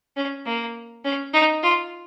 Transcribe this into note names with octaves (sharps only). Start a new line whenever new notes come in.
C#4
A#3
C#4
D#4
F4